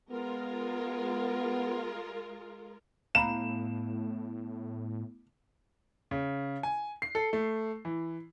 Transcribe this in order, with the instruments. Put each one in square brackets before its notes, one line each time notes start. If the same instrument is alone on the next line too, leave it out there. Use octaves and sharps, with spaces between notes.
[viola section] G#3 F4 A#4 [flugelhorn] B3
[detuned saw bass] A2 [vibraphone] A3 B3 E4 [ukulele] F5 A#5 B5 [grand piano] E7
[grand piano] C#3
G#5
C7
A4
A3
E3